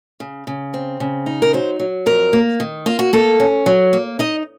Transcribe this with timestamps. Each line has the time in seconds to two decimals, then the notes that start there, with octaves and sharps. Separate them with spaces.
0.20 C#3
0.47 C#3
0.74 C4
1.00 C#3
1.26 D#4
1.42 A#4
1.53 F#3 C5
1.79 F#3
2.06 F2 A#4
2.33 A#3
2.60 D#3
2.86 A#3 F4
2.99 F#4
3.13 A#3 A4
3.40 C#4
3.66 F#3
3.93 A#3
4.19 D#4 D#5